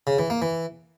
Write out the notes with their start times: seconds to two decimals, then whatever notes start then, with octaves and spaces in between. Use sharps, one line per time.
0.07 C#3
0.19 E3
0.30 A#3
0.42 E3